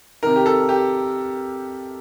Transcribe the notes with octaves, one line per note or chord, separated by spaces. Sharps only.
C3 D#3 A#4
G4
A4
G4